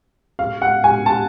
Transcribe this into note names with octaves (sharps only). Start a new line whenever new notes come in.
F5
F#5
G#5
A5